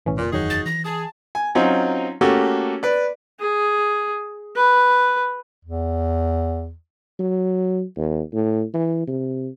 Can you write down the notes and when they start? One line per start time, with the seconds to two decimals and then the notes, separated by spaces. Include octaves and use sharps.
0.06 B1 A2 E3 C#4
0.18 F1 A#2
0.33 F#1 E2 D#3 F#3 D#4 F#4 G#4
0.50 A6
0.66 E3 A#6
0.85 G#4 A5
1.35 G#5
1.55 F#3 C4 C#4 D#4 F4
2.21 A3 A#3 C#4 F#4 G4 A4
2.83 B4 D5
3.40 G#4
4.55 B4
5.65 E2
7.20 F#3
7.97 D#2
8.33 A2
8.74 E3
9.07 C3